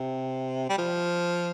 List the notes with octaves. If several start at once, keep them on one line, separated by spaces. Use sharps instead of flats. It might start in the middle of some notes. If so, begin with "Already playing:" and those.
Already playing: C3
G3
F3